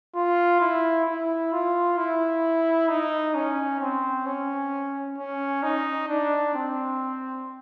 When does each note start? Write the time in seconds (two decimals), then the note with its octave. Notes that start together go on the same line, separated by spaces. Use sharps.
0.15 F4
0.61 E4
1.06 E4
1.52 F4
1.97 E4
2.89 D#4
3.35 C#4
3.80 C4
4.26 C#4
5.18 C#4
5.63 D#4
6.09 D4
6.55 C4